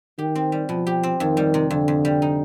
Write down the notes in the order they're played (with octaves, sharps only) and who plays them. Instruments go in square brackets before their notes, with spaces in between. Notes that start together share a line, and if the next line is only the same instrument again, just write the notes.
[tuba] D#3 [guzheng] G4
[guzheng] C4
G3
[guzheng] B2 [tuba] F3
[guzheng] G4
C4
[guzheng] F2 [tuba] D#3
[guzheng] G3
C3
[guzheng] F2 [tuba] D3
[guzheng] F2
G3
D#4